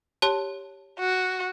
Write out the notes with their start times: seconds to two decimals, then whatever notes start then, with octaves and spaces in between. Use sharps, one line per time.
0.22 G4 C#5 A5
0.99 F#4